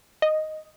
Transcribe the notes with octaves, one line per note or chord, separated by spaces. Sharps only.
D#5